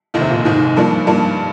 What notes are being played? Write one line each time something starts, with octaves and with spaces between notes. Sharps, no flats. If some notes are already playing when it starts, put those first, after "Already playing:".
F1 D#2 D#3
C3
A#2
F1 D#2 G#2 D#3
G2 F3 A#3 D4
G2 F3 A#3 D4